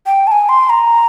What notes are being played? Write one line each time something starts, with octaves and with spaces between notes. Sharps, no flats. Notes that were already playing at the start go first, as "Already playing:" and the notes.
G5
A5
G#5
C6
A#5